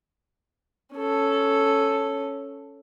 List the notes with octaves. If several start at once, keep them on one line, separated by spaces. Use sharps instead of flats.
C#4 A4